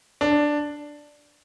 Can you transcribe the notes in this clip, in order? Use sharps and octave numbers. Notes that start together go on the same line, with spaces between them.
D4